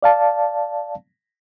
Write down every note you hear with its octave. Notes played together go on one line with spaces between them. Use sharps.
D5 F5 A5